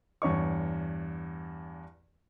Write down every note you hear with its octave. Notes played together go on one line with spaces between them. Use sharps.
E2 G2 C#5 C#6